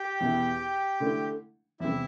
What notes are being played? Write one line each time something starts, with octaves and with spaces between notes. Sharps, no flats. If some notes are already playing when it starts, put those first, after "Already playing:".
Already playing: G4 G5
E2 B2 B3 E4
D3 A3 E4
E2 C3 G3 E4 E5